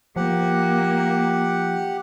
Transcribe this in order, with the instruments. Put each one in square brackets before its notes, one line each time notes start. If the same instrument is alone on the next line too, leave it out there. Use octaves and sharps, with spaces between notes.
[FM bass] F3 [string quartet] A#3 [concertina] G4 F#5